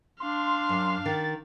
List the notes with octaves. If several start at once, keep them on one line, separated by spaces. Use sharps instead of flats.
D4 F5 C6
F#2
D#3 A6